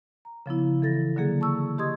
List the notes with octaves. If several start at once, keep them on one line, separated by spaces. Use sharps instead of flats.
A#5
C#3 F3 B3 E4
E3 A4 A6 A#6
D3 F#3 A#3 G#4
A5 C#6 E6
G4 D#5 C6 D#6 G#6